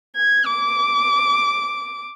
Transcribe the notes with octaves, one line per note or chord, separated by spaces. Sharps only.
G#6
D6